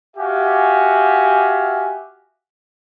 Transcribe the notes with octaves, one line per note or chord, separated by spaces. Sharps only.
F#4 G4 E5 F5 G#5